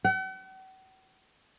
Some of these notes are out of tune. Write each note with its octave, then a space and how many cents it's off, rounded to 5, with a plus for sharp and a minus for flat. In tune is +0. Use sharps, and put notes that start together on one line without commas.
F#5 +45